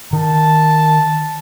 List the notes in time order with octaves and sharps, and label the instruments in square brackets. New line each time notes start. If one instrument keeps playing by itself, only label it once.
[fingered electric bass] D#3 [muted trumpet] A5